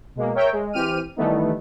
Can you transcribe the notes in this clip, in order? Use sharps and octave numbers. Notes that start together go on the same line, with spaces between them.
B2 G#3 A#3
A#4 C#5 E5 G5
G#3
E3 C4 G4 F6 D#7
D#3 E3 G3 A3 B3 D#4